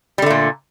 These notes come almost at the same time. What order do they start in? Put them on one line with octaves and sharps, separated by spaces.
G3 D3 A3 A#2